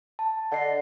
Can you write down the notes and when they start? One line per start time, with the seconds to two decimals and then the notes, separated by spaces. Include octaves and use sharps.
0.19 A5
0.52 D3 D#5 F#5 C7